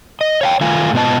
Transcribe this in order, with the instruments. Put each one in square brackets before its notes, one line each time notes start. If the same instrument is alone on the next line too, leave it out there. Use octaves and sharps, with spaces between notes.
[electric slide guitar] D#5
C#5 F5 G5
D#3 A3 F4 F5 G#5
G#2 B2 B3 F4 D#5 A5